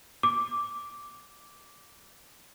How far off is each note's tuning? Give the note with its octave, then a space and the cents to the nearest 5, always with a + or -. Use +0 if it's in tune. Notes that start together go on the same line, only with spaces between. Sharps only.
D6 -10